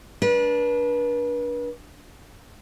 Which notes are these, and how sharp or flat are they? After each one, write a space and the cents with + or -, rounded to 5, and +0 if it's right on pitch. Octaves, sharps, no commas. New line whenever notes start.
D4 -15 B4 -40